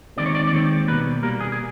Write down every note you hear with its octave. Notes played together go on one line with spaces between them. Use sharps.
D#2 D#3 G#3 C4 D5
C#5
D5
D5
D#2 D#3 G#3 C4 C#5
B2 G3 A#3 B4
B2 G3 A#3 A#4
G#4
G#4